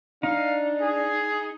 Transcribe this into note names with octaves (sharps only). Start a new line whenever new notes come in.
D4 D#4 F5
G#4